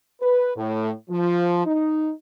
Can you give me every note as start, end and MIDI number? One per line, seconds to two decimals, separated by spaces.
0.21 0.51 71
0.56 0.91 45
1.10 1.64 53
1.65 2.11 63